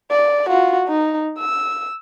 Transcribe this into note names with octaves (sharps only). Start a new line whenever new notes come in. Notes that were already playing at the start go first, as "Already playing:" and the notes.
D5
F4 F#4
D#4
E6